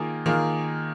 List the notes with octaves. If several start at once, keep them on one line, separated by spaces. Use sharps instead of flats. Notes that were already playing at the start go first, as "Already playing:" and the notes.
Already playing: D#3 A#3 F4 G#4
D#3 A#3 F4 G#4